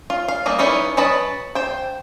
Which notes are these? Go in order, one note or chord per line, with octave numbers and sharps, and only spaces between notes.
F4
F5
G3 A#3 D#5
B3 C#4 D#4 E4 B4
F#3 B4 D#5 A5 B5
C5 G5